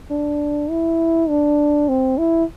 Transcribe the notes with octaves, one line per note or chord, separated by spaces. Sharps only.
D4
E4
D4
C4
E4